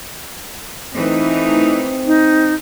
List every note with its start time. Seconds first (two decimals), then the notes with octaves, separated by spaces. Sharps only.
0.94 E3 A3 C4 D#4
2.07 D#4